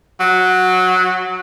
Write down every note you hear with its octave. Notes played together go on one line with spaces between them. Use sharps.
F#3